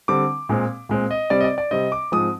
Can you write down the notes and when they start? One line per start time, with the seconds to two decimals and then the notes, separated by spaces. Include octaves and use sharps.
0.08 D3 G3 C4 D6
0.49 A#2 G#3 C4
0.89 A#2 G#3 C4
1.11 D#5
1.30 C3 G3 C4 D5
1.40 D#5
1.44 D5
1.58 D5
1.71 C3 G3 C4 D#5
1.92 D6
2.12 G#2 F3 G#3 C4 D#6